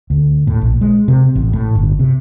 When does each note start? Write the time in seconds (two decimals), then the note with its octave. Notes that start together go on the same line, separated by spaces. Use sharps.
0.10 D2
0.47 A2
0.61 A#1
0.81 G#3
1.08 C3
1.35 A1
1.53 A2
1.75 G1
1.99 C3